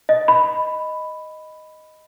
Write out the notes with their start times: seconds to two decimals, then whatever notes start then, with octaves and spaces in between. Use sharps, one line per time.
0.09 D#5
0.28 B5